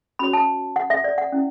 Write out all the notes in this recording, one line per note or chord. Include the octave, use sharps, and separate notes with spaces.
C#4 F#4 C#5 B5
A5
F#5
E5
D5
F#5
C#4 E4